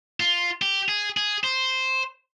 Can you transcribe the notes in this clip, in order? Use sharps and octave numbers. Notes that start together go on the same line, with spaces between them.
F4
G4
G#4
G#4
C5